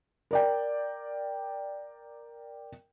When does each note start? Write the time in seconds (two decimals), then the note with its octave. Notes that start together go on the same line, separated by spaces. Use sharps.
0.31 A#4 D5 G5